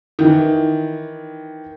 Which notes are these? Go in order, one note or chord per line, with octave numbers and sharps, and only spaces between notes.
D#3 E3